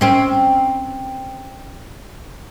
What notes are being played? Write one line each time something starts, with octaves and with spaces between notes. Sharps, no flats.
C4 C#4